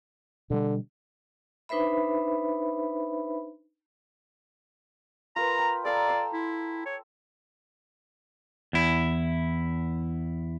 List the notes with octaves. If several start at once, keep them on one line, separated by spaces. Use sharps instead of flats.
B2 D3 G3
D4 D#4 B4 C5 E5 B5
F4 A#4 B4 A#5
G5
A4 D5 F5 A#5
C6 D6 E6
E4
C#5
E2 E4